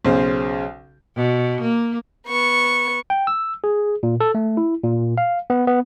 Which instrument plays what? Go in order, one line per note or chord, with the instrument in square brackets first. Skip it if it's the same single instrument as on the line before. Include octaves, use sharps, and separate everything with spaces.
[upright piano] B1 C#3 C5
[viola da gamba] B2
A#3
[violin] B3 C#6
[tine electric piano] G5
E6
G#4
A#2
A4
A3
E4
A#2
F5
B3
B3